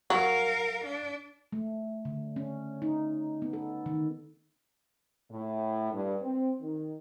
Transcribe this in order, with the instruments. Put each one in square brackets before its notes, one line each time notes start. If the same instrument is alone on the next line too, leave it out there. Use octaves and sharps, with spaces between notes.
[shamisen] F#3 [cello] A#4 F5
[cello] D4
[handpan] A3
D3
C#4
D#4
B3
A4
D#3
[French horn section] A2
G2
C4
D#3